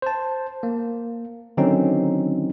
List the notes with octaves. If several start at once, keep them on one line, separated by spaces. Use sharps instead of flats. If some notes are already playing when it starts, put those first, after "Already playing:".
C5 A5
A#3
D3 D#3 F#3 C4 C#4 D#4